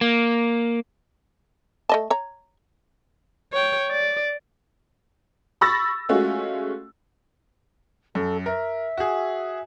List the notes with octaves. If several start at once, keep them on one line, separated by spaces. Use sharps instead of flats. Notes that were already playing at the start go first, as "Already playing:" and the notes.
A#3
A3 D#5 A5
C#5 A#5
C#5 G5
D5
B5 C#6 E6 A6 A#6
G#3 A3 C#4 F4 F#4
F#2 A4
A#4 E5
F#4 G#4